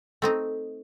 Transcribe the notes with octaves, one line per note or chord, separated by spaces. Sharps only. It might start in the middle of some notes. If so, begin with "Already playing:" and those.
A3 C4 D#4